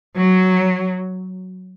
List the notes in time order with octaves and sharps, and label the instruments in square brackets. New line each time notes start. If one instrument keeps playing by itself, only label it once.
[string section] F#3